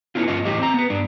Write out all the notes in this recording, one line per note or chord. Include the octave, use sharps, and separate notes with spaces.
B3 C#4 E4 F4
G2 C#4 F4 D#5
E2 A2 G4 D#5
C4 A#5
B3 B4
G2 D4